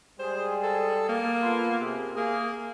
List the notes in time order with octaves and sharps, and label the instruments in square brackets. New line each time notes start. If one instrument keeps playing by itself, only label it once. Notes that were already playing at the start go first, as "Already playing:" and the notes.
[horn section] G3 G#3 G#4 [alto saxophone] C5
[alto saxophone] A4
A#3
[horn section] B3 F4 A4
C3 G#4
[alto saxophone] A#3 [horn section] G#4